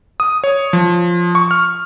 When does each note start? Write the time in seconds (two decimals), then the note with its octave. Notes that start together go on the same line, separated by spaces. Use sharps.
0.20 D#6
0.44 C#5
0.73 F3
1.35 C#6
1.51 F6